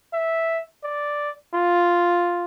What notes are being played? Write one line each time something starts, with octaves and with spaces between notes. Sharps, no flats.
E5
D5
F4